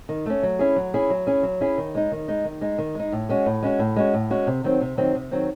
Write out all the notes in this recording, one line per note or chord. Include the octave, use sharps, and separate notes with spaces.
D#3
A3 C#4
F#3
C#4 E4 G#4
F#3
C#4 E4 G#4
F#3
C#4 E4 G#4
F#3
C#4 E4 G#4
D#3
G#3 D#4
D#3
G#3 D#4
D#3
G#3 D#4
D#3
G#3 D#4
A2
G#3 C#4 F#4
A2
G#3 C#4 F#4
A2
G#3 C#4 F#4
A2
G#3 C#4 F#4
C3
D#3 F#3 C4
C3
D#3 F#3 C4
C3
D#3 F#3 C4